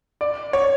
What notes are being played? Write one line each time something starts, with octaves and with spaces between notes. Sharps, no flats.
D5
C#5